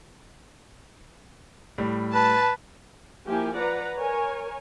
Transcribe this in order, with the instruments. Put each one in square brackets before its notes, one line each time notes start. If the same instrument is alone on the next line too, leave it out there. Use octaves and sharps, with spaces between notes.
[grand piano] A2 G3
[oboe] B4 [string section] A5
[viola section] F3 A#3 E4 G4 G#5
B4 D5 F#5 A#5
A#4 C#5 G#5